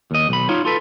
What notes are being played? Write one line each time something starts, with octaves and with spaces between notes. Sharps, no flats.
D#2 D#5
B1 B5
D#4 F4 C#5
F4 A4 B4